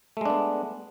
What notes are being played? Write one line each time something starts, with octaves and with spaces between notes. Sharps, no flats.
G#3 A3 B3 D4